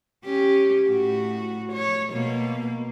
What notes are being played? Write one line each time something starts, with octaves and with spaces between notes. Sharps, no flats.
C#4 G4
A2 F#4
C#5
B2 A#3